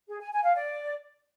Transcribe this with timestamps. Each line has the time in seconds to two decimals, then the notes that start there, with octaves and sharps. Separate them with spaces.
0.08 G#4
0.20 G#5
0.32 G#5
0.44 F5
0.55 D5